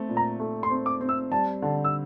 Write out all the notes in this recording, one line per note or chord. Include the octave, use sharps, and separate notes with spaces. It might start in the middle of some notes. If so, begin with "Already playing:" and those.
Already playing: A3 C4
A#2
A#5
A3
C6
C4
D6
C4
E6
G3 A5
D3 A5
E6